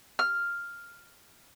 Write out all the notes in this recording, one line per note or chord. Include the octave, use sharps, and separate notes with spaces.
F6